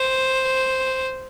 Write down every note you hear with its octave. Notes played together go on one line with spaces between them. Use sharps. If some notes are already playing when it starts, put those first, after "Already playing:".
Already playing: C5